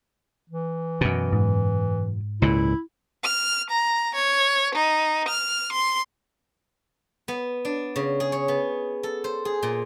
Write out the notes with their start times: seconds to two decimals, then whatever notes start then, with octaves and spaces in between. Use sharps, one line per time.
0.50 E3
1.01 F#2 B2
1.33 G#2
2.42 C#2 A#2 E4
3.24 F6
3.70 A#5
4.15 C#5
4.75 D#4
5.28 F6
5.72 C6
7.28 B3
7.65 D4
7.96 C#3
8.20 G#4
8.32 C#5
8.48 B3
9.03 A4
9.24 C5
9.45 G#4
9.63 A#2